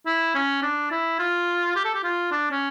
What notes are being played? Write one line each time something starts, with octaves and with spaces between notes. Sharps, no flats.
E4
C#4
D4
E4
F4
G4
A4
G4
F4
D4
C#4